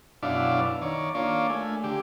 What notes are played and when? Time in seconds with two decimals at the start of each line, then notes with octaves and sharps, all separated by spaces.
0.23 F#2 B2 D4 E4 D5 F5
0.81 D#3 C#5 D5
1.15 A#3 D4 F4 C#5 D5
1.50 A3 G#5
1.84 D3 G4